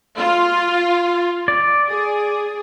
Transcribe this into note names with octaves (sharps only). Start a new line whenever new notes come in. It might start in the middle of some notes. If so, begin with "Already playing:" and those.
F4
D5
G#4